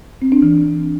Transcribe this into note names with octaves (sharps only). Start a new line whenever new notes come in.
C4
D4
E3